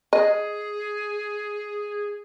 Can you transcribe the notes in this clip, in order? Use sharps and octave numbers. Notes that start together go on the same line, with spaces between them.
G#4 D#5